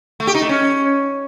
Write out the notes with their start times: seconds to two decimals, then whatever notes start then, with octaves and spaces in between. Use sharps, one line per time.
0.20 A3
0.27 G4
0.35 D#4
0.42 A3
0.49 C#4